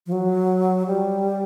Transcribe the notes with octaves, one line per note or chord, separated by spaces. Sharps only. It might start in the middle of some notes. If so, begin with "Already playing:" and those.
F3
F#3
G3